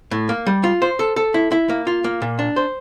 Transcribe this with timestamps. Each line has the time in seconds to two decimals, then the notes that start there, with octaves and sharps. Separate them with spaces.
0.11 A2
0.29 A#3
0.47 G3
0.64 F4
0.82 C5
0.99 A4
1.16 A4
1.34 E4
1.52 E4
1.69 A#3
1.87 F4
2.04 A#3
2.22 A#2
2.39 D4
2.56 C5